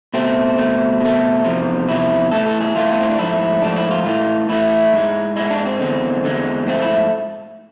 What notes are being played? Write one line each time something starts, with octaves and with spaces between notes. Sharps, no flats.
B2 A3 C4
B2 A3
B2 A3
E2 C3 F3
E2 C3 F3 E4
A2 E3 A3 A4
A4
G#4
A2 E3 A3 F4
B3
C4
D4
G#2 F3 A3 E4
G#2 F3 A3 D4
E4
F4
A2 E3 A3
A2 E3 A3 E4
G#2 G#3
G#2 G#3 E4
D4
C4
E2 D3 G#3
E2 D3 G#3
G#2 F3 A3 C4
E4